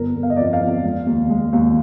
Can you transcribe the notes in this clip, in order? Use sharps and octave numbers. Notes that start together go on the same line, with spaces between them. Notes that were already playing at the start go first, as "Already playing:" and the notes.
Already playing: G1 A#4
G1
F5
D#5
F2 D5
D#5
F5
F2
G#3
D#2
G#3
D#2